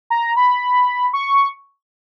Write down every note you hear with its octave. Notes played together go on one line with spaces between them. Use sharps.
A#5
B5
C#6